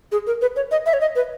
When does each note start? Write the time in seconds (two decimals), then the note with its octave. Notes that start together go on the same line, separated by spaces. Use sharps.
0.12 G#4
0.27 A#4
0.42 B4
0.56 C#5
0.71 D#5
0.86 E5
0.93 C#5
1.00 D#5
1.16 B4